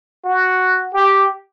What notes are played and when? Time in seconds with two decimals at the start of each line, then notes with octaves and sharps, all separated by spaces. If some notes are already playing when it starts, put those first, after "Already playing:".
0.24 F#4
0.93 G4